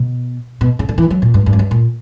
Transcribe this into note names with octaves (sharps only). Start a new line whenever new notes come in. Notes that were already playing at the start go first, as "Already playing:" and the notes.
Already playing: B2
B2
C#3
D3
E3
F#3
A#2
G2
G2
F#2
G2
A#2